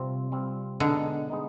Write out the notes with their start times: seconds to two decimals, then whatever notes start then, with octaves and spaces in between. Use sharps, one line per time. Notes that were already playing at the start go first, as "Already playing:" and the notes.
Already playing: C3 G3 C4 F4
0.32 G3 C4 F4
0.80 B2 D3 G#3 B3 D#4
1.30 G#3 B3 D#4